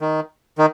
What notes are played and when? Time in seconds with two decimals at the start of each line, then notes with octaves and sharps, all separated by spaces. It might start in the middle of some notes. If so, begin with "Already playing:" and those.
0.01 D#3
0.58 D#3